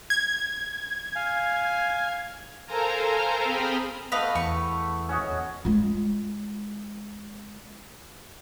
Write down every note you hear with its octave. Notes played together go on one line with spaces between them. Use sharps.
G#6
F5 G#5
A4 A#4 C5 F5 G#5 A#5
C4 G#4 G5 B5 D#6 F6
A3 B3 B4 D#5 F5
E2 C#6
C#4 F#4 D#5
G#3 F4